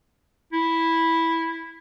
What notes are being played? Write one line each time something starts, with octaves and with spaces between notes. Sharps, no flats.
E4